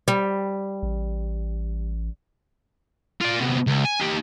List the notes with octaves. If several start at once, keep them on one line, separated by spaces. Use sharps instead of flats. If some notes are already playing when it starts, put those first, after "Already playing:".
G3
A1
F4 D5
C3 B3
C#2
G#5
D#4 G4